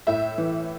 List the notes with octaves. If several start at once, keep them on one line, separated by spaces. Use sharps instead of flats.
A2 E5
E3